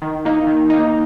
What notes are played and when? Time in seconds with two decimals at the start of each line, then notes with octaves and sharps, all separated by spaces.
0.02 D#3
0.25 A#3 D#4
0.47 D#3
0.70 A#3 D#4